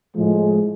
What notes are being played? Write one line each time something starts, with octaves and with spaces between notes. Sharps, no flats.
A2 F3 G#3